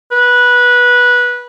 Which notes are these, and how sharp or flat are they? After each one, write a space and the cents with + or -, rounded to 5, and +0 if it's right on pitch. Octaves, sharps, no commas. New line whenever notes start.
B4 -15